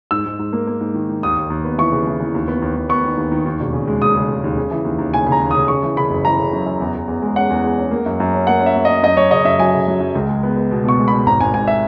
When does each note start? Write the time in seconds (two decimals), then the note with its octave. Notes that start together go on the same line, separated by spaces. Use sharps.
0.11 G#2 E6
0.26 G#2
0.39 G#2
0.53 A#3
0.67 A#3
0.81 G#2
0.94 D#3
1.09 D#3
1.23 D#2 D#6
1.37 D#2
1.50 D#2
1.65 B3
1.78 E3 C#6
1.92 C#3
2.07 E3
2.20 E3
2.34 D#2
2.48 B3
2.62 D#2
2.76 D#2
2.89 B3 C#6
3.04 D#3
3.17 D#2
3.32 D#3
3.45 D#2
3.60 E1
3.73 C#3
3.88 G#3
4.02 C#3 D#6
4.16 C#3
4.29 C#3
4.44 D#2
4.57 C#3
4.71 E3
4.85 D#2
4.98 D#2
5.13 C#3 G#5
5.26 C#3
5.32 A#5
5.41 D#2
5.51 C#3 D#6
5.68 C#3 C#6
5.83 E3
5.97 C#3 B5
6.10 F#1
6.25 E3 A#5
6.39 C#3
6.53 F#2
6.66 F#2
6.80 E2
6.95 E2
7.08 E2
7.22 G#3
7.36 C#4 F#5
7.50 E2
7.64 E2
7.78 C#4
7.91 A#3
8.06 F#2
8.20 F#2
8.34 C#4
8.47 A#3 F#5
8.61 C#4
8.66 E5
8.75 A#3
8.85 C#4 D#5
9.03 F#2 D#5
9.17 F#2 C#5
9.31 C#3 D#5
9.45 F#2 E5
9.59 F#3 G#5
9.74 C#3
9.87 F#3
10.00 F#2
10.15 C#2
10.29 G#3
10.43 B3
10.57 B3
10.71 B2
10.84 B2 C#6
10.98 G#3
11.08 B2 B5
11.26 G#1 A#5
11.40 G#1 G#5
11.54 G#2 G#5
11.68 E5